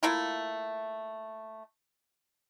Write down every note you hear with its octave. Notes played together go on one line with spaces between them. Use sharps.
A3 A#3 E4 F4